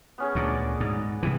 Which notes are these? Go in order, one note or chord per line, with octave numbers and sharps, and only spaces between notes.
B3 C#4 G#4
D2 A#2 D5 D6
G#2 D#5
G2 C3 E3